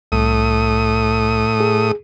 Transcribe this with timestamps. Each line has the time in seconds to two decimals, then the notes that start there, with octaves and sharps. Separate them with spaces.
0.12 C2 A2 D#6
1.60 G#4